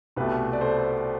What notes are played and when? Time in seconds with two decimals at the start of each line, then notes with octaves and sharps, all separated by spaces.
0.16 C2 B2 A3 G4 B4
0.53 D5
0.60 A4 C5